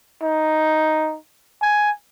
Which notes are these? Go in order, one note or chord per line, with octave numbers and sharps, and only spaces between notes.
D#4
G#5